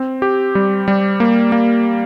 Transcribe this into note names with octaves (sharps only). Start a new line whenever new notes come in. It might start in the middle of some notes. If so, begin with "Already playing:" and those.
Already playing: C4
G4
G3
G3
A#3
A#3